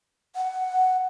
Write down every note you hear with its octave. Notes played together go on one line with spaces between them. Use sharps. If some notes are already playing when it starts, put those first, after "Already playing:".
F#5